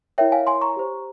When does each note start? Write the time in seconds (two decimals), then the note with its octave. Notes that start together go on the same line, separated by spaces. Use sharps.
0.18 E4 A#4 C#5 E5 G5
0.32 F5 G#5
0.47 G#5 C6
0.61 A#5 C#6
0.76 G4 C5